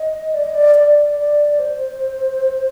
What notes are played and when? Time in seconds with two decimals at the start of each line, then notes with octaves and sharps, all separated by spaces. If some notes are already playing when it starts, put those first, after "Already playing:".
Already playing: D#5
0.33 D5
0.44 D#5
0.54 D5
0.75 D5
1.17 D5
1.59 C5